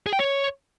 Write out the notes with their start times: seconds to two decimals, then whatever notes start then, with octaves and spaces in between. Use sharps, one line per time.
0.06 G#4
0.13 G5
0.19 C#5